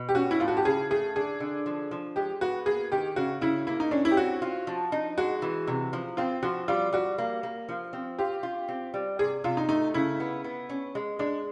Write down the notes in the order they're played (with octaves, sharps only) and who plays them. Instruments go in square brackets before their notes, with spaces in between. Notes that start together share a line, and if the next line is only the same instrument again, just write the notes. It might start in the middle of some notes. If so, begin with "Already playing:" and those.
Already playing: [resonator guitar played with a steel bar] B2
[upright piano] G4
[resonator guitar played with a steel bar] C#4 [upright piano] F#4
[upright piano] E4
[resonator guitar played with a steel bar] A2 [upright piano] F4
[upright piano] F#4
G4
[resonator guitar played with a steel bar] C#3 [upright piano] G#4
[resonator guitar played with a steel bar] A3 [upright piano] G#4
[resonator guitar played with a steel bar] D3 [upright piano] G#4
[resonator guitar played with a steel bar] D3
F3
F3
[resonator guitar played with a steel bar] G#3 [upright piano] G4
[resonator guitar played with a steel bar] B3 [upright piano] F#4
[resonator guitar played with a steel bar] A#3 [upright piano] G#4
[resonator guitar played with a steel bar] D#3 [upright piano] G4
[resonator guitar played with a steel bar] C#3 [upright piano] F#4
[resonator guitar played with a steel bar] C#3 [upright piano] E4
[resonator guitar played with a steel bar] A#3 [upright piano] E4
[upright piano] D#4
[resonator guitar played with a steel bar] C#4 [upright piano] D4
[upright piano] E4
G4
[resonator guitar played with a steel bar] C4 [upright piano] F#4
[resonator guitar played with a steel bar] F4
F3
D#4
[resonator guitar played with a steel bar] G#3 [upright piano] F#4
[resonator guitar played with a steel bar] E3
C3
F3
[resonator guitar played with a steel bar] C4 [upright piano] F4
[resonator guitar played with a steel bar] F3 [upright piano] F#4
[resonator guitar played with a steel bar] G3 [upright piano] F4
[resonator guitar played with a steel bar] G3 [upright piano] F#4
[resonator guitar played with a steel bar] A#3
A#3
F3
C4
[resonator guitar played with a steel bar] F4 [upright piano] G4
[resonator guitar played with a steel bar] F4
C4
G3
[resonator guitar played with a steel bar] C3 [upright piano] G#4
[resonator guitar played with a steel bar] C3 [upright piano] F4
[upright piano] D#4
[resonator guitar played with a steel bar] A3 [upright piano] D#4
[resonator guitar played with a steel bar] C#3 [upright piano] E4
[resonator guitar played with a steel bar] B3
B3
C#4
G#3
[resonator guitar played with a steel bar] G#3 [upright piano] D4